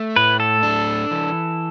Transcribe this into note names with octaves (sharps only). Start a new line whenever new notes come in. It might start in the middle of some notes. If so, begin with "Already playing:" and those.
Already playing: A3
A2 B4
A4
D4
E3